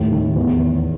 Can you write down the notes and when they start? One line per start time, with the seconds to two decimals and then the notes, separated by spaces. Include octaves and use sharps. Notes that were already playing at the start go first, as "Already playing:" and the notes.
Already playing: D#2 A2
0.12 D#3
0.36 E2